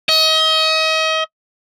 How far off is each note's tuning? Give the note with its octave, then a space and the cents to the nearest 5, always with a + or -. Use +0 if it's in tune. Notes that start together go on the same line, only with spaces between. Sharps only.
D#5 +35